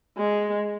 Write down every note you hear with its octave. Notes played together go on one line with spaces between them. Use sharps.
G#3